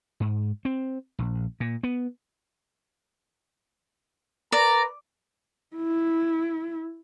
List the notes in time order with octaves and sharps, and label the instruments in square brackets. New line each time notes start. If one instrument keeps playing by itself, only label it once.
[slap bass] G#2
C4
A#1
A#2
B3
[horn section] A#4 B4 A#5 [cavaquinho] D5
[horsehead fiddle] E4